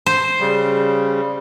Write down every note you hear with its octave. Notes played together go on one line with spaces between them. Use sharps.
C5
C#3 G3